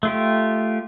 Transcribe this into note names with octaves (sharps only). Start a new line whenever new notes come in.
A3 F4 G4